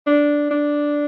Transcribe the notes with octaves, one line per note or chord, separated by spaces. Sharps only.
D4
D4